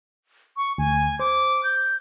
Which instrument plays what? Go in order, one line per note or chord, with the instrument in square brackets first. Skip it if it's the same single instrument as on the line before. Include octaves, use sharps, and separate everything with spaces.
[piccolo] C#6
[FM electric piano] D2 [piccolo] G#5
[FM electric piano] C5 [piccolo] D6
[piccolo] G6